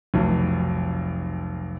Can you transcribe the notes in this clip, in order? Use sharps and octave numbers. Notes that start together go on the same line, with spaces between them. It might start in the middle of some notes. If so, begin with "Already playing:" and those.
F1 B1